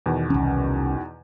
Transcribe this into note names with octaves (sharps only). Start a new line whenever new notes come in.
E2 B2 D#3
C2 C#4